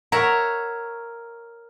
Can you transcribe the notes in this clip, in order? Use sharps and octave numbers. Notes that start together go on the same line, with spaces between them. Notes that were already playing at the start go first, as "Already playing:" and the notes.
A#4 C#5 E5 F#5